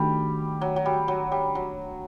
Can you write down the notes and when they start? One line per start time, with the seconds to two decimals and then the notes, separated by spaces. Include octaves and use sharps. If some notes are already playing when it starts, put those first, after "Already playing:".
Already playing: D#3 G3 A3 D4 F#4
0.61 F#3
0.76 F#3
0.86 G3
1.08 F#3
1.32 G3
1.55 F#3